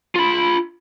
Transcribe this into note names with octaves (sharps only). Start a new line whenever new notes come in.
F4 B5